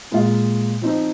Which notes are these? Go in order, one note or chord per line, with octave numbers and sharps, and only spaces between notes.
A#2 G#3 F4
F3 C4 D#4